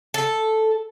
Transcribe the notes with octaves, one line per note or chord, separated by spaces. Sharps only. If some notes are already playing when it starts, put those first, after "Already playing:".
A4